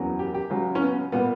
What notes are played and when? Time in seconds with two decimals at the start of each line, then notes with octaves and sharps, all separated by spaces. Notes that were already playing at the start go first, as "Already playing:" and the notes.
Already playing: F#1 E2 C#3 F#3
0.19 G4
0.34 G4
0.50 C#2 C#3 F#3
0.75 C#4
0.81 B3
1.12 A#2 G3 B3